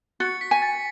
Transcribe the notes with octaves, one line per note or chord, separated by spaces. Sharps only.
F#4 A6 C#7
B6
G#5 B6
A6